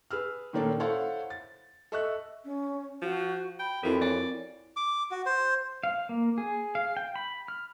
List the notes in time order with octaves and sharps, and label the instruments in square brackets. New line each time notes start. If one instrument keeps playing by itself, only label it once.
[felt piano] G#4 B4 E6 F6
A#2 D#3 A#3 C#4 D4 A4
E4 A4 C5 C#5 F5 F#5
A6
A4 D#5 E5 C#6 E6 F#6
[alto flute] C#4
[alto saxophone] F3 [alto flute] F#4
[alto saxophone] G5 [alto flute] B5
[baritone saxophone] F2 [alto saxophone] E3 [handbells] E4 F#4 A#4
[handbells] C4 G#5 [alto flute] C#5 [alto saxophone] D5
[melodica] D6
F#4
C5
[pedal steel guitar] F5
A#3
G#4
F5
G5
B5
F6